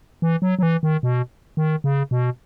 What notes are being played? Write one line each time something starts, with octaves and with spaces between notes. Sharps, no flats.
E3
F#3
F#3
E3
D#3
B2
D#3
C#3
B2